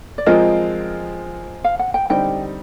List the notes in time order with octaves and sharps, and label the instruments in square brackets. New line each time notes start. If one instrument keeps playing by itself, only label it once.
[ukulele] D5
[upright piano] F3 G#3 C4 F4 A#4 [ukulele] D#5
[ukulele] F5
F#5
G5
[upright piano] D3 G3 C4 D#4 G4 [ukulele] G5